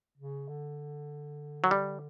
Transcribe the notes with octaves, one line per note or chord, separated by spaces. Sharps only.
C#3
D3
F#3
G3